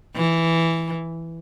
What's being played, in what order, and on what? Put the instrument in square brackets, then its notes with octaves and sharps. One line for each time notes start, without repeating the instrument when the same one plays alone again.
[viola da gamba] E3